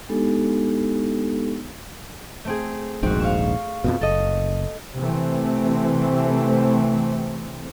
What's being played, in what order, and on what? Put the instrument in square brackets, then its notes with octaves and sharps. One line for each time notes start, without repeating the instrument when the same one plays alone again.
[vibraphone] G#3 B3 D4 D#4 G4 A4
[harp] A3 C4 G#4
[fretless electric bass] D#1 A#1 G#2 [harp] C4 F#4
[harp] F5 C#6 E7
[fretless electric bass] F2 G#2 B2
[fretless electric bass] F#1 [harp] A4 D#5
[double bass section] C3 E3 A3 C4